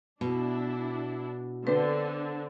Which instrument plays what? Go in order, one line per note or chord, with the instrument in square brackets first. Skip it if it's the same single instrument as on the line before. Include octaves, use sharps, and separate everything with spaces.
[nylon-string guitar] B2 [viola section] D4 E4
[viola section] D3 [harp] C4 D4 C5 [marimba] B4